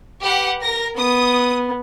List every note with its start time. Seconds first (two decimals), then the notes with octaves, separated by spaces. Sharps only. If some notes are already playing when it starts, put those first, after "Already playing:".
0.21 G4 B4 F#5
0.61 A#4 A#6
0.97 B3 D#6